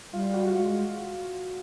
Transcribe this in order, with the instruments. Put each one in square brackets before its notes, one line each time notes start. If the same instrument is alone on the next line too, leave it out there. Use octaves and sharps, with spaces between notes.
[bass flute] G3 [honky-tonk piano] F4
[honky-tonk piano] F#4
F#4
[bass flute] G#3 [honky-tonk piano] F4